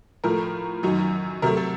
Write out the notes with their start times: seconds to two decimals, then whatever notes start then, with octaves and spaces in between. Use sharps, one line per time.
0.24 A2 F3 A3 A#4
0.83 F#2 D#3 F#3
1.42 C3 F#3 A3 A#4
1.57 A4